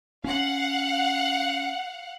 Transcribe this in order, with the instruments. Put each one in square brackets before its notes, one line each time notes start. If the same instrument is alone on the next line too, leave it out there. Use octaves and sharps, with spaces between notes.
[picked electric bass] C#4 [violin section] F5 F#5